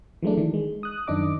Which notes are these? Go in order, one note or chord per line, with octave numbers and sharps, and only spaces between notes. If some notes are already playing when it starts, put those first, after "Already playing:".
E3 F#3 G#3 A3 D4
D#3
G#3
D#6 F#6
F#2 D#3 D4 D#5 D6